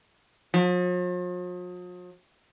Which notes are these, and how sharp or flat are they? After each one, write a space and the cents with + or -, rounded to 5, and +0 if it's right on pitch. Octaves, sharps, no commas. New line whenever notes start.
F3 +45